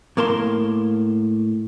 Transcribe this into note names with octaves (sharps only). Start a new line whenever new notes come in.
A2 A#3 A#4 A5 C6